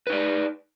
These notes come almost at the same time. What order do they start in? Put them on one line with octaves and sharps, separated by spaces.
B4 D#4 D5